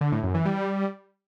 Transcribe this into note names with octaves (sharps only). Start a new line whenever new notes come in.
D3
A2
F#2
E3
G3